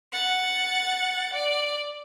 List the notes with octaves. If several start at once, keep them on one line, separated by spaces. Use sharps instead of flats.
F#5 A6
D5